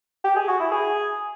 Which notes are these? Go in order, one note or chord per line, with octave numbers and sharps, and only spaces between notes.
G4
G#4
F#4
E4
G#4